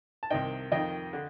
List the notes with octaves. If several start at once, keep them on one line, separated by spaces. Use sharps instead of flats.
A5
C2 C3 D#3 D#5 G5
F2 D#3 D#5 G5
D3